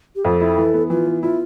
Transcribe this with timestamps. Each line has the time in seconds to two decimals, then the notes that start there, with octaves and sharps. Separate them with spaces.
0.16 G4
0.24 F2 A4
0.41 E4
0.57 E3
0.73 B3
0.90 E3 F4
1.06 B3
1.22 E4 F4